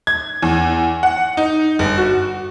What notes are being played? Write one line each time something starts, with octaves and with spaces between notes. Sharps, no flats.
G#6
E2
F#5
D#4
G1
F#4